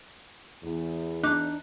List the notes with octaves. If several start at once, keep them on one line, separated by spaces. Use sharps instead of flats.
E2
E2 D4 D#4 D6 F#6